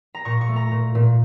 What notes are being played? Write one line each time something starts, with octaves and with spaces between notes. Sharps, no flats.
A#5
A#2 C#6
C#6
A3
A#5
A#2
A#2